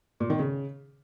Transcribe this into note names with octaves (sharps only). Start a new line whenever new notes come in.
A#2
D#3
C#3